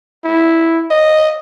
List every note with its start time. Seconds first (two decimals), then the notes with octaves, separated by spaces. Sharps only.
0.25 E4
0.91 D#5